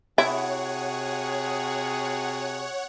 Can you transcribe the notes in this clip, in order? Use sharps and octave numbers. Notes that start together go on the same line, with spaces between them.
C3 E4 F#4 G#4 C#5 F#5